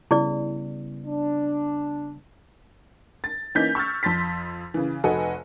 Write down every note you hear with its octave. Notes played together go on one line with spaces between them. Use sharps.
C#3 G3 B3 E4 G#4 D5
D4
A6
E3 A#3 C#4 D#4 G6 B6
C#6 E6 F6 A6
F2 C6 A6 B6
C#3 E3
F1 F#4 A4 B4 D#5 G#5